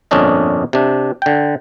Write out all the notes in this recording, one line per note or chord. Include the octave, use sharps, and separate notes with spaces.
G1 F2 A#2 C#4 D4 D#5
C3 D4
D3 G5